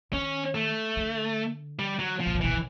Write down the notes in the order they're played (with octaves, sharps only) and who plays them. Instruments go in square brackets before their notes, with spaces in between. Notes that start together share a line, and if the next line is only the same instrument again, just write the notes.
[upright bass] D#3 [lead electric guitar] C#4
[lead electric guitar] A3
[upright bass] D3
[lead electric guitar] G3
F#3
F3
[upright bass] A2
A#2
[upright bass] B2 [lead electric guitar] E3
[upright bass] C3